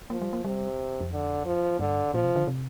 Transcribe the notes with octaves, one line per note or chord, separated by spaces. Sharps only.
F3 A#3
G3
A#3
C3 G3
F2
D3
F3
G2 D3
A#2 F3
C3
D3
C3